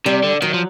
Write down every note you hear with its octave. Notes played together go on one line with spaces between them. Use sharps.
C3 G3
D3
D#3 F#3
F3